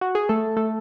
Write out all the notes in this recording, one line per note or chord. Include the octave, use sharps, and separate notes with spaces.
F#4
G#4
A3 A4
A3 A4